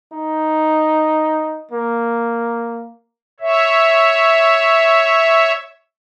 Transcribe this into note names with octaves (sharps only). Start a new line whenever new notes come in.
D#4
A#3
C#5 E5